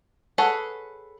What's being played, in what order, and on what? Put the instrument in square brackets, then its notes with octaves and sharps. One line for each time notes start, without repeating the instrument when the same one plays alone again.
[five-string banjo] G#4 A4 B4 C#5 F#5